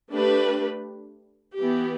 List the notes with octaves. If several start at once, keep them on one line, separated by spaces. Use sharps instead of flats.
A3 D4 G4 B4
E3 B3 G4